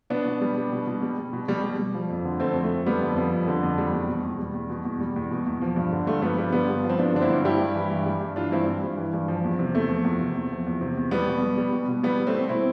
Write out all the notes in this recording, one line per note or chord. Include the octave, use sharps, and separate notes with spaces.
B2 B3 D4
B2
G3
G3
B2
B2
G3
G3
B2
B2 G3
G3
G3
F3
F2
D3
F2 A3 C4
F3
A3
F2
D3 G3 B3
F2
F3
F2
D3
F2
G3
E2
B2
E2
G3
E2
B2
E2
G3
E2
B2
E2
F3
G2
D3
G2 A3
F3 G3 B3
G2 G3 B3
D3 G3 B3
G2
F3
C4
G2 B3 D4
D3 D4
C4 E4
G2
G3 E4 G4
G2
E3
G2
G3
G2
E3 D4 F4
G2 C4 E4
G3
G2
E3
G2
F3
E2
C3
E2 A3
F3
E2
C3
E2
F3
E2
C3
E2
B2 G3 B3
B2
G3
G3
B2
B2
G3 B3
G3
A3 C4
B2
B2 C4 E4